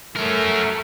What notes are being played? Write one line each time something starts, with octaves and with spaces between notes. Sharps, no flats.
A3 C#4 A#4